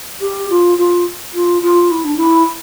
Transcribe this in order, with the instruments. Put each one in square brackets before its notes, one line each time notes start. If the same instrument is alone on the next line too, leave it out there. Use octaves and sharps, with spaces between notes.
[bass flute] G4
F4
F4
F4
F4
E4
D4
E4